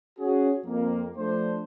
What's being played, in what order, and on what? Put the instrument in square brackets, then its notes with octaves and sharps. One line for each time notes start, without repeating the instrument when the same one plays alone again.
[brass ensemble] C#4 F#4 G#4
F2 A#3
F3 A3 D4 C5